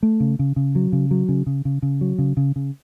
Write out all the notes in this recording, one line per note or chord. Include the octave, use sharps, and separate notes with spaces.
A3
C#3
C#3
C#3
F#3
C#3
F#3
C#3
C#3
C#3
C#3
F#3
C#3
C#3
C#3